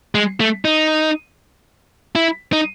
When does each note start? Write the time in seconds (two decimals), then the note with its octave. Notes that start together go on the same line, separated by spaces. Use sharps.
0.15 G#3
0.40 A3
0.65 D#4
2.15 E4
2.53 D#4